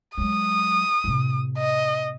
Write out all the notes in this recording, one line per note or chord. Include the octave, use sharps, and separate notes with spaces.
F#3 G#3 D#6
A2 C3
D#5